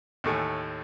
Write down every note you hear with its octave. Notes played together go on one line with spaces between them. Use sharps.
D#2 A2 A3 G#5